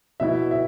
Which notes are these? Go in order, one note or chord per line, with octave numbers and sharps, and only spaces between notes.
B2 B3 E4 E5
E5